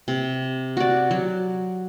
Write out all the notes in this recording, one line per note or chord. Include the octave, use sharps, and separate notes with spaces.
C3
F#4 D5
F#3